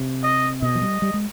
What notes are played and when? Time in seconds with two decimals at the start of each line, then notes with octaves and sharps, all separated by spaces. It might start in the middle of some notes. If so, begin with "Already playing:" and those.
Already playing: C3
0.23 D#5
0.62 B2 D#5
0.75 F3
0.82 G3
1.02 G3
1.14 G#3